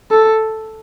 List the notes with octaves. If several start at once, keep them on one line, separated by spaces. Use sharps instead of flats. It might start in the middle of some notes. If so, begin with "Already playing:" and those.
A4